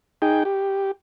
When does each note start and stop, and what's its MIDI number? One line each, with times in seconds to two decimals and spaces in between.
0.22 0.44 63
0.22 0.44 68
0.22 0.44 79
0.45 0.91 67